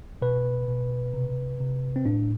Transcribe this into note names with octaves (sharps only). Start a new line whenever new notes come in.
B2 B4
B2
C3
C3
C4
A2 D4